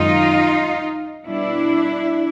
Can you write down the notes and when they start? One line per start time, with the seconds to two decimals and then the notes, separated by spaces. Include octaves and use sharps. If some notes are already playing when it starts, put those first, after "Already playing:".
Already playing: F#2 D#3 G#3 D#4 F4
1.25 B2 G3 D4 E4